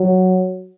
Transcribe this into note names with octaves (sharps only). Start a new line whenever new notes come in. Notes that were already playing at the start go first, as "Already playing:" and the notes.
Already playing: F#3